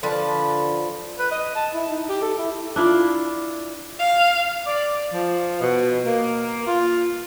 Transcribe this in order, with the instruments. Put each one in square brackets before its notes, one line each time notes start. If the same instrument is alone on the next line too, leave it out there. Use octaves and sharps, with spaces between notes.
[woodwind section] D3 [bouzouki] F3 B4 D5
[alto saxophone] B4
D#5
A5
E4
D#4
G4
A4
E4
[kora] D4 E4 F4
[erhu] F5
[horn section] D5
F3
B2
A#3
F4